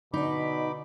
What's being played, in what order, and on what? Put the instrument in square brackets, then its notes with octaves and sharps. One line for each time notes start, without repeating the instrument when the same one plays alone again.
[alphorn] B2 [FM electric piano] D3 D5 [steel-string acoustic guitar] D#4 [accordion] B5 D6